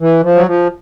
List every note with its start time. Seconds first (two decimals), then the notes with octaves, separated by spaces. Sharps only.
0.01 E3
0.23 F3
0.35 F#3
0.47 F3